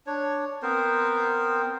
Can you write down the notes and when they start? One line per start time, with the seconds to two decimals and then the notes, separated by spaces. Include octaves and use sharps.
0.07 D4 C#5
0.62 B3 C4 A#4 C5